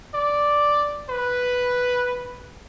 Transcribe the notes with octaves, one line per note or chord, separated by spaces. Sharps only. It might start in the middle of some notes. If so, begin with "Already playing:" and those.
D5
B4